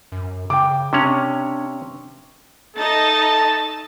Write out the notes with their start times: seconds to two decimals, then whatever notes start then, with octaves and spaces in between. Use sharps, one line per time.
0.12 F#2
0.50 C#3 G5 D6
0.93 C3 C#4 D4 C#6 F7
2.76 A3 D#4 A4 D#5 A5